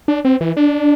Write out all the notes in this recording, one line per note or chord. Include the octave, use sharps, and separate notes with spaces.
D4
C4
E3
D4